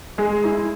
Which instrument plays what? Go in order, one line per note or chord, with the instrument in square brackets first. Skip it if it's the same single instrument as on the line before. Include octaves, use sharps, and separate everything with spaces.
[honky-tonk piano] G#3
E4